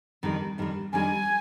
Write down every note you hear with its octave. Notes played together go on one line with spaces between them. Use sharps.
F2 D#3 G3 D4
F2 D#3 G3 D4
F2 D#3 G3 D4 G#5